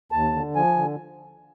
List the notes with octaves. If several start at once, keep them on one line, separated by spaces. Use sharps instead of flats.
D#2 A5
D3
F3 G#5
D3